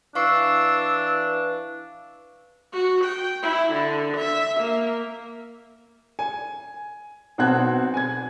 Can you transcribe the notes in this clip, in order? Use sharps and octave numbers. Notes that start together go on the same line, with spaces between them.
E3 D4 F5 C#6 E6 C7
F#4
G5
E4
D3
E5
A#3
G#5
B1 B2 C4 F#4 F#6 G#6
G#5 G#6